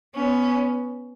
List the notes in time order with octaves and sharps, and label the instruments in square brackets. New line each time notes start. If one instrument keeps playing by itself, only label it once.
[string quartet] B3 C#4